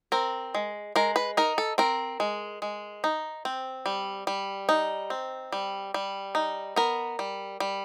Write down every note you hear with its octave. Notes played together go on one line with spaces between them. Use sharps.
C4 A#4
G#3
G#3 A#4
B4
D#4 A#4
A4
C4 A#4
G#3
G#3
D#4
C4
G3
G3
D#4
C4
G3
G3
D#4
B3 A#4
G3
G3